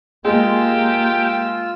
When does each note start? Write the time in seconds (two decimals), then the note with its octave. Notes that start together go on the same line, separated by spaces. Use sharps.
0.25 G#3 A#3 F4 G4 E6